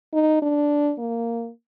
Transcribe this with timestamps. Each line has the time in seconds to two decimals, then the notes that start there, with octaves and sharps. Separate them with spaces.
0.13 D#4
0.42 D4
0.99 A#3